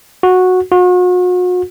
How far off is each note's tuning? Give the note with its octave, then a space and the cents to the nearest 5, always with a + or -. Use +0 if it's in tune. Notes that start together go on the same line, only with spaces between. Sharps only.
F#4 -10
F#4 -40